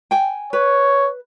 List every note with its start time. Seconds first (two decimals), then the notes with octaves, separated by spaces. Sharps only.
0.11 G5 G#5
0.53 B4 C#5